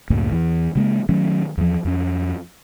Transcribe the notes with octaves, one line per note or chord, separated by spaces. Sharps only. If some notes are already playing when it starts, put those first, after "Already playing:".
C#2 F#2 A2 A#3
E2 E3
C#3 G#3 A#3
D#3 F#3 A3 C#4
E2 F3
F2 C#4